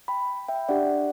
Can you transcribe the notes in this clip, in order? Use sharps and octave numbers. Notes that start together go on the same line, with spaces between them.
G5 B5
E5 G5
D4 G4 D5 F#5